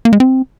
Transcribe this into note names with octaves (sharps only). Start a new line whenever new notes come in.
A#3
G#3
C4